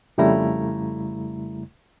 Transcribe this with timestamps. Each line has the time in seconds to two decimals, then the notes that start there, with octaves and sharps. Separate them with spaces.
0.18 F2 C#3 G3 A3 E4 A#5